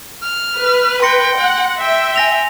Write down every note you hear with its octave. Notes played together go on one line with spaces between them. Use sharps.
F6
B4
G5 C6 A#6 C#7
F#5
E5 G5
G#5 A#6 F7